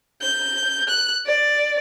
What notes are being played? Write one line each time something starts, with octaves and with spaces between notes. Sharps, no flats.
G6
F#6
D5